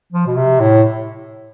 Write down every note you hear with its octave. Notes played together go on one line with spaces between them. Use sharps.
F3
B2
C3
A2